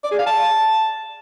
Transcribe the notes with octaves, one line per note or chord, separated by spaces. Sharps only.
D5
G#4
F5
A5